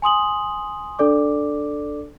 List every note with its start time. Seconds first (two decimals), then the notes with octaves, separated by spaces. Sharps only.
0.02 G#5 C6 D#6 F#7
0.99 D4 A4 D5 D6